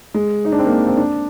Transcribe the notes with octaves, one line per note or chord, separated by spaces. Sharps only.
G#3
D#4
D4
C4
A#3
C4
D4